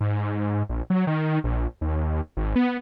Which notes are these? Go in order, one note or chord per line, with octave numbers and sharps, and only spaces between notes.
G#2
A#1
F#3
D#3
A#1
D#2
G#1
B3